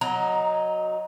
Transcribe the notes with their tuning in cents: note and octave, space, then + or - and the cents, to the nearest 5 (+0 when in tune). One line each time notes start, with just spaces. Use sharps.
F#3 -10 D#4 +0 A#5 +20